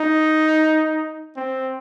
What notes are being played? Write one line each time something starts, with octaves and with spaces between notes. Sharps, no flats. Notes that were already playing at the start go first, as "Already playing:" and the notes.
Already playing: D#4
C4